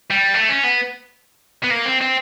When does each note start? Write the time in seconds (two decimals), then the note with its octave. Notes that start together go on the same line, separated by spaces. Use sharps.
0.11 G3
0.35 A3
0.50 C#4
0.64 B3
1.64 B3
1.71 A#3
1.85 C4
2.01 C4